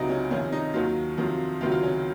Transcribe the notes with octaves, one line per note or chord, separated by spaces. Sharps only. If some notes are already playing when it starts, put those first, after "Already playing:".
Already playing: C#2 C3 F#3 D#4
C#4
F2 C3 D#3 C#4
D#4
D#2 D#3 F#3 F4
F2 C3 D#3 F#3
C#2 C3 D#3 F#3 F4
F4
C#4